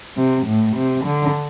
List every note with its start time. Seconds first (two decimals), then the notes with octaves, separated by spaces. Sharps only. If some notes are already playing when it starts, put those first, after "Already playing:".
0.17 C3
0.47 A2
0.76 C3
1.05 D3